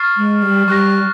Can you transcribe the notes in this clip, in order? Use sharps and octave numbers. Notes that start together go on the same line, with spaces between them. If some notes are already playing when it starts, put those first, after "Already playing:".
Already playing: C#6 F6 A6 C7 E7
G#3
G3
G3 C#6 F#6 A#6